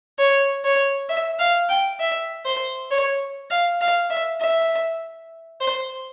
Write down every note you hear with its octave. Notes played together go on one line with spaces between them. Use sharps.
C#5
C#5
E5
F5
G5
E5
C5
C#5
F5
F5
E5
E5
C5